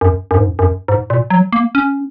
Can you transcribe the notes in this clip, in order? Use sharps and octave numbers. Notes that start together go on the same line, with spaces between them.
F#2
F#2
G#2
F#2
F#2
G#2
A#2
F#3
A#3
C#4